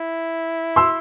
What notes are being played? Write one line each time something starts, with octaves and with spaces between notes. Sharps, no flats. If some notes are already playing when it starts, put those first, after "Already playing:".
Already playing: E4
C6 E6